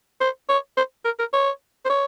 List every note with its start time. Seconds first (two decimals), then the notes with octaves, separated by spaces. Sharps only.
0.20 C5
0.49 C#5
0.77 C5
1.05 A#4
1.19 A#4
1.33 C#5
1.85 C5
1.89 C#5